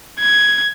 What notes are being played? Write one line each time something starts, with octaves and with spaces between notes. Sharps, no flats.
G#6